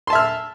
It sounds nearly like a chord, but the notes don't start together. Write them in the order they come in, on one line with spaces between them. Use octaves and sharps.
C6 A5 E5 F6 E6